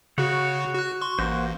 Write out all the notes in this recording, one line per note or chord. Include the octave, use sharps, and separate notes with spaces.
C#3 F#4 C#5 F#5
F#4 F#6
C6 C#6
A1 A#3 F#4 C5